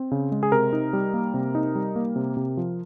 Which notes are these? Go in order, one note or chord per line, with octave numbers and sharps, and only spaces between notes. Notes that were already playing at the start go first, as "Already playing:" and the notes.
Already playing: C4
C#3
G#3
G#4
C3 A#4
D#4
G3
A#3
C3
D#4
G3
A#3
C3
C3
F3